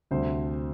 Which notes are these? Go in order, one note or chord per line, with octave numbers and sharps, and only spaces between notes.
D2 C3 G3 C5